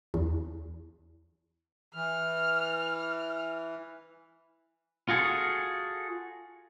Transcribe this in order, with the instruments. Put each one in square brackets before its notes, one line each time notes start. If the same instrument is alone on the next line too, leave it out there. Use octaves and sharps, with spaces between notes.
[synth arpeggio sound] E2
[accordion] E3 [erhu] F6
[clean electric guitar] F4 F#4 G#4 A4